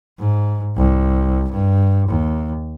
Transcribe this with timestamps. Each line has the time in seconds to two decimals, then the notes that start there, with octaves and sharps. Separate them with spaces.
0.19 G#2
0.76 C2
1.52 G2
2.09 D#2